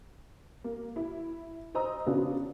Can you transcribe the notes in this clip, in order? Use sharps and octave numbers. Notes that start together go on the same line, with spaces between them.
A#3
E4
C5 D#5 A#5 D#6 E6
C#3 B3 D4 F4 F#4